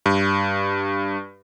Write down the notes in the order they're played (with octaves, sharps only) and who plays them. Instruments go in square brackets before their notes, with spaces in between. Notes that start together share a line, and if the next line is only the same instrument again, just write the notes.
[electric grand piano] G2